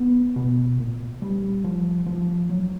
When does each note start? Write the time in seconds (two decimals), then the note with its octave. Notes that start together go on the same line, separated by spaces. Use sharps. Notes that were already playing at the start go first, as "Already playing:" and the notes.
Already playing: B3
0.36 B2
0.79 A#2
1.22 G3
1.64 F3
2.06 F3
2.50 F#3